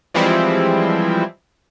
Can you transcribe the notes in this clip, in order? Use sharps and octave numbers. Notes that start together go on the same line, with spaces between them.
E3 F3 G3 G#3 C4 E4